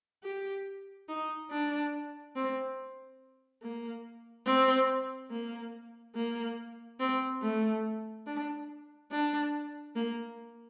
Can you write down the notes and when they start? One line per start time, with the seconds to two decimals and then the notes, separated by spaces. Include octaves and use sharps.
0.24 G4
1.08 D#4
1.51 D4
2.36 C4
3.62 A#3
4.46 C4
5.30 A#3
6.15 A#3
7.00 C4
7.42 A3
8.26 D4
9.11 D4
9.95 A#3